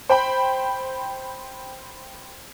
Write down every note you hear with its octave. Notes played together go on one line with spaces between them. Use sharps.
C5 G5 B5